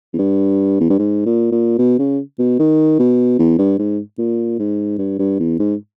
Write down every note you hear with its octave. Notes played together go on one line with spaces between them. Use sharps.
E2
G2
E2
G2
G#2
A#2
A#2
B2
C#3
B2
D#3
B2
E2
G2
G#2
A#2
G#2
G2
G2
E2
G#2